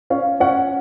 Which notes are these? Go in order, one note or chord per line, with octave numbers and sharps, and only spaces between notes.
C#4 F5
C#4 F#5